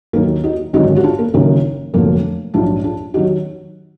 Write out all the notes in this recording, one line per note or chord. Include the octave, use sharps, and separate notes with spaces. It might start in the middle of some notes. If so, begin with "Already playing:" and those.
D#2 D#3 F#3 A#3
D#4 F#4
G#1 F#2 D3 F#3 D#4 F#4
F#4
D4 F4
A#3
F#1 F#2 D#3 F#3 A#3
F1 F2 D3 F#3 A#3
A#1 G#2 F#3 D4 F4
D4 F4
D#3 F#3 D#4 F#4